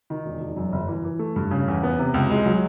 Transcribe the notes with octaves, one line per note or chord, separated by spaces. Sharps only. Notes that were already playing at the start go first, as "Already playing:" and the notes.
D#3
E1
E1
F#2
G1
E3
E3
A3
G2
C#3
E2
B3
C3
C#2
G#3
F#3